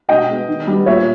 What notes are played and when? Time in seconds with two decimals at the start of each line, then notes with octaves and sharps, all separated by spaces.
0.08 B2 D#5 G5
0.28 G#3 B3
0.48 D#3
0.67 G3 B3
0.86 A#2 C#5 E5